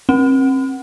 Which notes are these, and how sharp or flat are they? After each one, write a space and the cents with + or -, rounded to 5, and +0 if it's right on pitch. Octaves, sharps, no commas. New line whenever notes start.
C4 +35